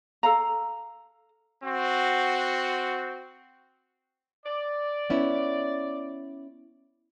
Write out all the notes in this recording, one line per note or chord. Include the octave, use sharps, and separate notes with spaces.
A4 F5 A#5
C4 F#4
D5
B3 C#4 E4